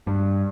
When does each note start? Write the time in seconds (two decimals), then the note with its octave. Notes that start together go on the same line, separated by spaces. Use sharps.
0.07 G2